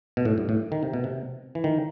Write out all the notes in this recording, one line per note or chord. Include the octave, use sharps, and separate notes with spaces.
B2
A2
G2
A2
D#3
C3
B2
C3
E3
D#3